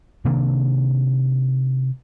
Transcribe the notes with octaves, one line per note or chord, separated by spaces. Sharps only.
C3 D#3 A#3 D4